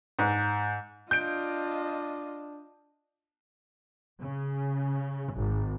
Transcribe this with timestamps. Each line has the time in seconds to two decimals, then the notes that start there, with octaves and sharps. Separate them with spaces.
0.19 G#2
1.11 D4 F4 D#5 G6 D7
4.21 C#3
5.34 G#1